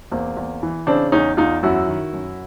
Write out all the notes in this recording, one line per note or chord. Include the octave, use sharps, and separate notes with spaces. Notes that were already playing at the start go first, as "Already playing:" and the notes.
E2 A#3 C4
E2
E3
C#3 C4 D4
E2 C#4 D#4
E2 D#4 F4
F#2 E4 F#4
D#3
F#2